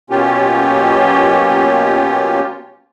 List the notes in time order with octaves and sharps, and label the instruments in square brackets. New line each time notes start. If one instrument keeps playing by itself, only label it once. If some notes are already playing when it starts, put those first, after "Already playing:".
[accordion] B2 F#3 A#3 C#4 F4 G4